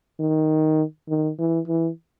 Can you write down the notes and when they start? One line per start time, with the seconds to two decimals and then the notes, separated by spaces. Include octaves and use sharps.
0.20 D#3
1.09 D#3
1.39 E3
1.68 E3